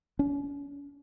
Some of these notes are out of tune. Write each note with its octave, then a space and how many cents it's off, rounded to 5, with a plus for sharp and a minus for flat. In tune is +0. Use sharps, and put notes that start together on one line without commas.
C#4 +40